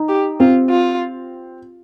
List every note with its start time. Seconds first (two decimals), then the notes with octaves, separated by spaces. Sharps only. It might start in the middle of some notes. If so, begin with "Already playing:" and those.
Already playing: D#4
0.09 G4
0.40 C4 F4
0.70 F4